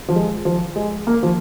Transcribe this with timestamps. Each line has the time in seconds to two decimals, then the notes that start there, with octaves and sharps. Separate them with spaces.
0.09 F3
0.16 G#3
0.45 F3
0.76 G#3
1.07 A#3
1.23 F3